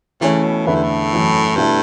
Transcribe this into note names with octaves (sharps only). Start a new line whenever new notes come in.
C#3 E3 A3 C#4
B2
E2 A2 D3 A3 E4 B4
G2
A2
F#2 E3 A3
G2 B2 A3 E4 A4